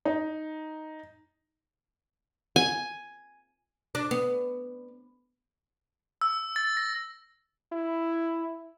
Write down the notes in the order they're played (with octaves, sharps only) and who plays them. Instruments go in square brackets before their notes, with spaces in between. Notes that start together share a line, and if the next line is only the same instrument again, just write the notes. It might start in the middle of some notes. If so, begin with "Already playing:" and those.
[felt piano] D#4
[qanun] G#5
[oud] D4
B3
[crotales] E6
A6
A#6
[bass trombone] E4